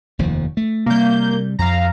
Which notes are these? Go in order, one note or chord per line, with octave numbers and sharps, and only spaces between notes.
F1 D#2 F3
A3
C3 G3 A#3 G6
F2 F5 A#5